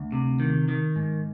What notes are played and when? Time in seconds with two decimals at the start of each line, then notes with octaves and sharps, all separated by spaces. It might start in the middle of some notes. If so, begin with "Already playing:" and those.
Already playing: D2
0.12 C3
0.40 D#3
0.68 D#3
0.96 G#2